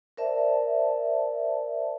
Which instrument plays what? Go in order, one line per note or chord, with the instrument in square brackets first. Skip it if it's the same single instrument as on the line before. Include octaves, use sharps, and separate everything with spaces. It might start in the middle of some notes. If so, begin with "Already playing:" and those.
[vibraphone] A#4 C5 D5 E5 A5